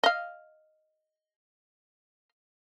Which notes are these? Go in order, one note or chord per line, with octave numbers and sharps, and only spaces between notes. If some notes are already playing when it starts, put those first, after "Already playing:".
D#5 F5